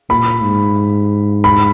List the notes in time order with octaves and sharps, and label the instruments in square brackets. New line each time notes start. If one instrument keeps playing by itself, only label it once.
[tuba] A#2 [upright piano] B5
[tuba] G#2
[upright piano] B5